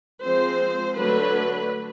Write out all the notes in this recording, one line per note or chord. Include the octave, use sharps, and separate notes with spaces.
F3 G#3 C4 C5
D3 F#3 A3 D4 B4